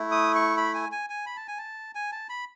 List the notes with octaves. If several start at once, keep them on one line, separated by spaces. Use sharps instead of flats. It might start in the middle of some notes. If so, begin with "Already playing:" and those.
Already playing: A3 E4
D#6
C#6
B5
G#5
G#5
G#5
B5
A5
G#5
A5
G#5
A5
B5